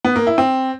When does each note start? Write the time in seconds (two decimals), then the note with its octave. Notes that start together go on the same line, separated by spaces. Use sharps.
0.05 B3
0.16 A#3
0.27 E4
0.38 C4